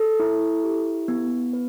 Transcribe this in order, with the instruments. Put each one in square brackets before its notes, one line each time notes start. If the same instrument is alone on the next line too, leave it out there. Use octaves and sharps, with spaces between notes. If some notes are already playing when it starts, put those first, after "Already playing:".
Already playing: [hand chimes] A4
E4
G4
B3
B4